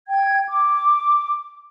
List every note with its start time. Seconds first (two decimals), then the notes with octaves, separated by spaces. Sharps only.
0.07 G5 G#6
0.47 D6